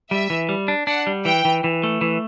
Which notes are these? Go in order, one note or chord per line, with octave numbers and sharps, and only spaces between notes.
G3 E5
E3
G3
D4
D4 F#5
G3
E3 G5
E3
E3
A3
E3